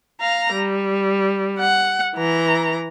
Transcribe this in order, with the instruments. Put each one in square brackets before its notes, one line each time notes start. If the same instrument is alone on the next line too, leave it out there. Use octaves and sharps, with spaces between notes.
[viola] F5 A#5
G3
F#5
E3 A#5